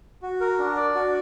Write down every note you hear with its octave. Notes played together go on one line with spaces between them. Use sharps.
F#4
A#4
D4
D5
F#4